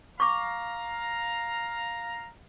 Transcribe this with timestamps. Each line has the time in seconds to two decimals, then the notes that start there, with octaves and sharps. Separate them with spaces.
0.20 F5 A#5 C#6 D6